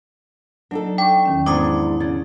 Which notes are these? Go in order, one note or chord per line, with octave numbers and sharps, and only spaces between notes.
F#3 D4 D#4 A4
G5 C#6 D6
E2 D#3 C#4
E2 G#2 B3 D4 D6 D#6
C#3 A6